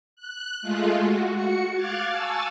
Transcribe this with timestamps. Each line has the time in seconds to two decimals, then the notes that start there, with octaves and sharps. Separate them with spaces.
0.16 F#6
0.62 G#3 A3 F4
0.99 F#4
1.36 F#4 C#7
1.73 F5 D6 F6 F#6 G#6 A6
2.11 G#5 A5 C#6 E6 A6